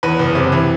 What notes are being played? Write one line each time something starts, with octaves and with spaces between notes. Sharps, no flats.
E2 B4
F#1
C3
E3